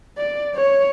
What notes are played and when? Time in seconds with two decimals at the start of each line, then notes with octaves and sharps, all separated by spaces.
0.18 D5
0.55 C#5